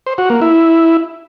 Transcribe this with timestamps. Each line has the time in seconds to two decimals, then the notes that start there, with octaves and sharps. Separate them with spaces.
0.07 C5
0.18 F#4
0.30 A#3
0.42 E4